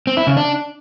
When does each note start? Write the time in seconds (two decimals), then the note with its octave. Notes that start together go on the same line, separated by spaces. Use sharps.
0.07 C4
0.17 E4
0.27 C#3
0.37 D4